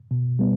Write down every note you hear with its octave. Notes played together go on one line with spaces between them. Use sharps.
B2
G3 B3